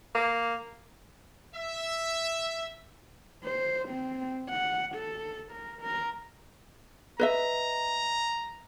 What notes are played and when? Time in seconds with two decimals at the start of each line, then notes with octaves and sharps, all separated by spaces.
0.15 A#3
1.55 E5
3.44 C5
3.88 C4
4.50 F#5
4.95 A4
5.52 A#4
5.81 A#4
7.20 B4 D#5 E5 A#5